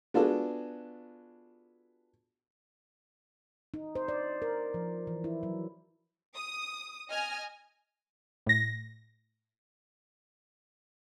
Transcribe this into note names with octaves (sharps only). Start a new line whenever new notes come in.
B3 D4 F4 F#4 G#4 A4
D#4
C5
D5
A#4
F3
E3
E4
F#3
D#6
D#5 G#5 F6
A2 A#6